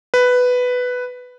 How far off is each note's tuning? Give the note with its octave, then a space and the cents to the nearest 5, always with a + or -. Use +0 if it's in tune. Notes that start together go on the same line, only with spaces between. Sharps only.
B4 +5